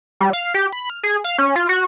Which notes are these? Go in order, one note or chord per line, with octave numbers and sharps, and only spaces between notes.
G3
F5
G4
B5
F6
G#4
F5
C#4
F4
F#4